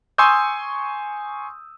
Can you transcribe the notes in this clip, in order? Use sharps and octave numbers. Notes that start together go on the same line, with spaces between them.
G#5 C6 C#6 D#6 E6 G6